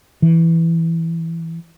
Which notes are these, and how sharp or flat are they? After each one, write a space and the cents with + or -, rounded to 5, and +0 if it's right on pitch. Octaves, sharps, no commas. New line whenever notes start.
E3 +5